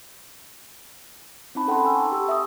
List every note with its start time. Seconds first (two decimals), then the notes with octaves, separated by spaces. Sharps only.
1.55 C4 C#4 D#4 A5 B5
1.68 A4 F#5 G5 A5 C6
1.84 G#5 E6
1.95 C#6
2.12 G4 E6
2.29 E5 D#6